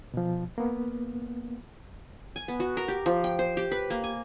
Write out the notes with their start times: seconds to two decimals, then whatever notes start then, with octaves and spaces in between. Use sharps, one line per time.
0.14 B2 F3
0.58 A#3 B3
2.36 G#5
2.48 B3
2.60 F#4
2.77 A#4
2.88 G4
3.06 F3
3.24 G5
3.39 C5
3.57 G4
3.72 B4
3.90 A#3
4.04 G#5